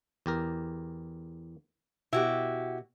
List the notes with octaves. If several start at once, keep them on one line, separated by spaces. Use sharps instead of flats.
E2 G4 A#4
B2 E4 F#4 G4